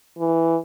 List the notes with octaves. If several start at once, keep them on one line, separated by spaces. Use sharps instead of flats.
E3